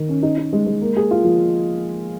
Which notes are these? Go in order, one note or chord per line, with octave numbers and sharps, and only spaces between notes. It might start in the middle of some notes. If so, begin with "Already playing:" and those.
Already playing: D#3
C#4
D#4
D#4
G#3
G#3
A#3
G#4
F4
F3